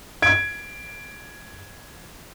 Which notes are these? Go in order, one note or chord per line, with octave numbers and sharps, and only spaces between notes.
G#6 D7